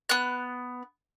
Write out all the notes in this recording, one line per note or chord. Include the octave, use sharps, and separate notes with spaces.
B3 F#6